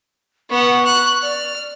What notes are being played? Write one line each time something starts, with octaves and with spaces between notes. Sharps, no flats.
B3 F#5 C#6
F#6
D5 F6